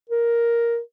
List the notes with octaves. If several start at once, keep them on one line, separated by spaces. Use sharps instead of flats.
A#4